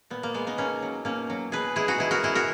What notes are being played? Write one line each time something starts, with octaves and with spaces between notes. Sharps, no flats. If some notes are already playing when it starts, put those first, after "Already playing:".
A#2 B3
A#3
G#3 B3
B3 D#4
B2 A#3 C#4
F#3
B2 A#3 C#4
F#3
B2 G#4 B4
G#3 E4 G#4
D#4 F#4
B2 E4 G#4
F#4 A#4
G#3 E4 G#4
F#4 A#4